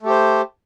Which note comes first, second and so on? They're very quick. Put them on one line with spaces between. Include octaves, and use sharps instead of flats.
A3 G4 C5